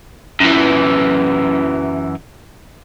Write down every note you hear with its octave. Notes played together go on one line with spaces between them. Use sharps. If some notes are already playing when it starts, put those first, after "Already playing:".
F#2 E3